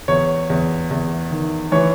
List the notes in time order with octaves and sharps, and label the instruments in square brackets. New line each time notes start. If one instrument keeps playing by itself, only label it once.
[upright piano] E2 C#5
E2
E2
D#3
E3 C#5